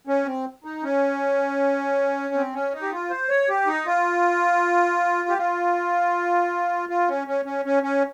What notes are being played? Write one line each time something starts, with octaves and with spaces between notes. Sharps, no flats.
C#4
C4
D#4
C#4
C4
C#4
D#4
G4
F4
C5
C#5
G4
D#4
F4
G4
F4
F4
C#4
C#4
C#4
C#4
C#4